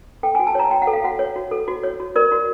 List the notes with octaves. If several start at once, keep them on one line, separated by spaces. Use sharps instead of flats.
A4 G5
G#5
F#4
A5
C#5 A#5
F#4 G5
F#5
A4
F5
F#4 F#5
C#5
F#4
A4
F#4
C#5
F#4
A#4 D5
F#4